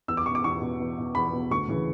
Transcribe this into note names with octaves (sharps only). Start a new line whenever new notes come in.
E2 E6
D6
B2 C#6
D6
E2 C#6
B2
E2
B2
E2 B5
B2
D2 C#6
C#3 E3